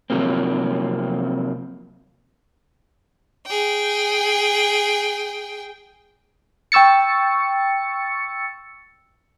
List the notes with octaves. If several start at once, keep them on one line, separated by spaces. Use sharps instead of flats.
C3 F3 F#3 A#3 C4
G#4 G5
G5 C#6 E6 A6 C#7